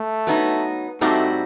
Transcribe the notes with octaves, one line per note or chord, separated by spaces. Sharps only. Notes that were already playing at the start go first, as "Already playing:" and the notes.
Already playing: A3
F#3 B3 D#4
A2 G3 A3 C4 D#4 F#4